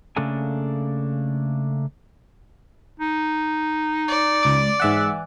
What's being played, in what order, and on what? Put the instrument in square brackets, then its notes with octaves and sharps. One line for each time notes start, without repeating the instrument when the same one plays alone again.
[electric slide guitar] C#3 A3 A#3 D4 A4 G#5
[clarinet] D#4
[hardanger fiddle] D5
[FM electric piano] C#2 D6
[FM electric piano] G#2 E5 F#5 [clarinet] E3